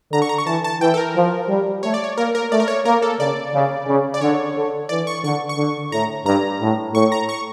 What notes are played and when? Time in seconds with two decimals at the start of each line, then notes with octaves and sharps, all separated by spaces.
0.12 D3 A#5
0.22 C#6
0.29 A#5
0.38 C#6
0.47 E3 A5
0.64 A5
0.81 E3 G5
0.94 A4
0.97 A#4
1.15 F3
1.49 G3
1.83 A3 C#5
1.94 D5
2.04 C#5
2.17 A#3 A#4
2.35 A#4
2.52 A3 D5
2.60 A#4
2.68 C#5
2.85 A#3 A#4
3.02 A4
3.19 C#3 D5
3.54 C#3
3.88 C#3
4.14 D5
4.21 D3 C#5
4.56 D3
4.89 E3 D5
5.07 C#6
5.24 D3 C#6
5.49 C#6
5.57 D3
5.92 A2 A#5
6.26 G2 A#5
6.61 A2
6.94 A2 C#6
7.12 A#5
7.29 C#6